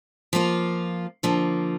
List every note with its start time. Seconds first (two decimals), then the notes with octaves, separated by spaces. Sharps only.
0.33 F3 A#3 F4
1.23 D3 F3 A#3